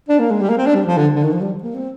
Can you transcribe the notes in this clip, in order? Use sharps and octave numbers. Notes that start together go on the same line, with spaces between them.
D4
A#3
G#3
G3
A#3
C4
D4
G3
F3
D3
D3
D#3
F3
G3
A#3
C4